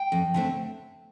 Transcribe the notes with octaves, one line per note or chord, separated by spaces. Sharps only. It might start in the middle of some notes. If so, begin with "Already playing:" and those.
Already playing: G5
F2
D3 A3 C4